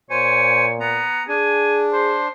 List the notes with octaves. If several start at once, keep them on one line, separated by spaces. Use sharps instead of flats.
A#2 C5 C#5 G#5
B3 A#5
D4 G#4 G#5
C5